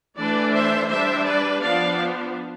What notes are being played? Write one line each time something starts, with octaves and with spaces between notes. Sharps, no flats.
E3 A3 D4 B4 D5
C5 E5
G3 D4 C5 E5
B4 D5
F3 B3 D4 D5 F5